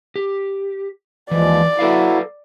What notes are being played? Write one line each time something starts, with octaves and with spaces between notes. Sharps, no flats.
G4
D#2 E3 F3 G#3 D5
F#3 E4 A4 B4 F5